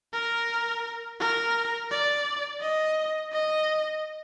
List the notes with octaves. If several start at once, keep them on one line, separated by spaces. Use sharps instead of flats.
A#4
A#4
D5
D#5
D#5